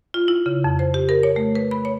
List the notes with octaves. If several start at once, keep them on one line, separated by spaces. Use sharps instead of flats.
F4
E4
C#3
F2
C5
G4
A#4
C#5
A3
B4
B5
C#5